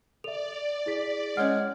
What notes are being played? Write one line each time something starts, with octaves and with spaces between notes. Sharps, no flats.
A4 D5 E5 F7
E4 G#4 B6
G#3 C#4 C#5 F#5 F6